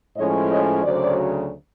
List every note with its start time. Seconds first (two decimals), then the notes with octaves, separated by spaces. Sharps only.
0.17 A2 F3 G#3 C#4 C#5 D#5
0.50 C#5 D#5
0.84 D2 C#3 F#3 C5 D5